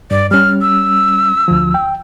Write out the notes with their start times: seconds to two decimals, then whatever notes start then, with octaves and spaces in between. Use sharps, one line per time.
0.11 G2 D5
0.31 G3 C#4 F6
0.61 E6
1.48 D2 F3
1.74 G5